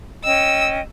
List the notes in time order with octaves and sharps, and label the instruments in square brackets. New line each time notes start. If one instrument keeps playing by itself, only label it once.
[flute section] C#4 D#5 G5 [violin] E6